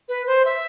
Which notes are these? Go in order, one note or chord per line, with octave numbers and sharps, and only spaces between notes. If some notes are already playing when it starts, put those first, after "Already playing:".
B4
C5
E5